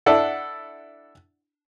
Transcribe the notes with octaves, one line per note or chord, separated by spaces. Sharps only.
D4 E4 A4 D5 F#5